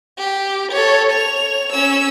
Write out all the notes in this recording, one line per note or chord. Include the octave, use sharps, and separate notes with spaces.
G4
A4 C#5
C#5 F7
C#4 E6